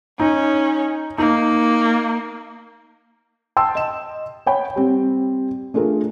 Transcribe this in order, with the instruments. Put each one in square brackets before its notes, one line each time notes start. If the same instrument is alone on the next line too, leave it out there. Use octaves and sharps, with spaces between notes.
[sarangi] C#4 [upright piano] D#4
[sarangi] A#3 [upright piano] D#4
[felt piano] G5 A5 C6 E6
D#5 E7
C#5 F#5 G5 B5
G3 C4
A3 D4 F4 G#4 A#4